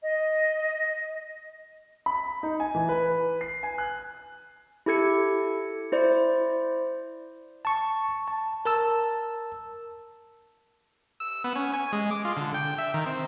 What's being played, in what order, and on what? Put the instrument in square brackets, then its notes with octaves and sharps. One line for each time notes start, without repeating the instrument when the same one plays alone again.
[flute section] D#5
[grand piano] B5
D#4
G#5
E3
B4
C7
G#5
F#6
[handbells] E4 G4 A4 G#6 C#7
E4 C5 D5
[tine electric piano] A5 C#6
A5
A#4 A5 E6
[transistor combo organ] E6
B3
C#4
G#5
G#3
D6
F4
D3
G5
E5
D#3
C4